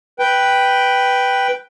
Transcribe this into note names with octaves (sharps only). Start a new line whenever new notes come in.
B4 G5